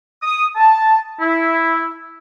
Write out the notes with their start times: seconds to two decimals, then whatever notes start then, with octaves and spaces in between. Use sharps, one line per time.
0.23 D#6
0.56 A5
1.21 E4